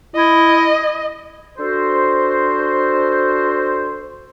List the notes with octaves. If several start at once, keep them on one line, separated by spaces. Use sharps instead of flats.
E4 D#5
D4 F#4 A4 C5